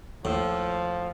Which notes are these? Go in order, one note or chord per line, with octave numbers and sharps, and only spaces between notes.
D#2 A2 F3 E6